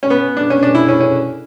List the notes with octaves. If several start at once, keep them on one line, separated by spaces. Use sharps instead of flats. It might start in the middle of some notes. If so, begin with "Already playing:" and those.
C#4
B3
D4
C#4
D4
E4
C#4
C#4